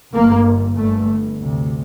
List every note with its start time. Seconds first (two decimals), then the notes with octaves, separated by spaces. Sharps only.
0.13 G1 G2 A#3
0.75 G1 G2 A3
1.38 D2 C3